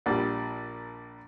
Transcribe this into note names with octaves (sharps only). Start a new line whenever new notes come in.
A#1 G3